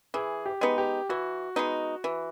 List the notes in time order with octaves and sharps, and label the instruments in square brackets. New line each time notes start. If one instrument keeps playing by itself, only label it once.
[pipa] E3 [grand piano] G#4
[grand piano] G4
[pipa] G#3 B3 D#4
[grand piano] G4
[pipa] E3 [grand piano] F#4
[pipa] G#3 B3 D#4
E3